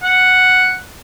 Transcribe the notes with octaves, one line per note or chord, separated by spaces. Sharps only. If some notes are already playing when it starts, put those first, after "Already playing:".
F#5